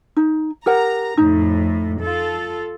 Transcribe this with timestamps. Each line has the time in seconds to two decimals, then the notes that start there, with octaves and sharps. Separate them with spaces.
0.17 D#4
0.66 G4 A#4 F#5 A#5
1.17 F2 A2 D#4
2.01 F4 A4